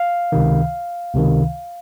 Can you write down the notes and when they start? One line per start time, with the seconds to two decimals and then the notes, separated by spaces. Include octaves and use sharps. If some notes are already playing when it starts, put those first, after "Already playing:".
Already playing: F5
0.32 C#2 C3 D#3
1.14 C#2 C3 D#3